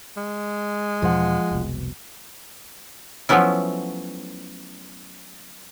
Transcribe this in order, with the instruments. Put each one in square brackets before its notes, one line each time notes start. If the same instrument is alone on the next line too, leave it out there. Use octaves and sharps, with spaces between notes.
[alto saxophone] G#3
[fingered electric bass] E2 B2 C#4 [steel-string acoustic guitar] F3 F#5
[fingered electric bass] F1 C2 B2
[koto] F3 F#3 A3 B3 C#4 E4